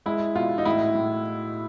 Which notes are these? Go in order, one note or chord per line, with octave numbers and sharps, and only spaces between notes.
G#3 E4
B2 F4
D#4
A2 E4
A2